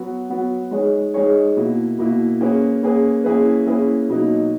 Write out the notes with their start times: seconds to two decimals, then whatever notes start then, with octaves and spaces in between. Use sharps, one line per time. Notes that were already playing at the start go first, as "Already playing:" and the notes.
Already playing: F#3 B3 F#4
0.30 F#3 B3 F#4
0.71 G#3 D#4 G#4 C#5
1.14 G#3 D#4 G#4 C#5
1.57 B2 A#3 E4
1.98 B2 A#3 E4
2.41 A#3 C#4 G#4 B4
2.83 A#3 C#4 G#4 B4
3.24 A#3 C#4 E4 G#4 B4
3.66 A#3 C#4 E4 G#4 B4
4.09 B2 F#3 A#3 D#4